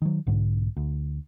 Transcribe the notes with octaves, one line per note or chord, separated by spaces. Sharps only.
D#3 F#3
B1 G#2 D3
D2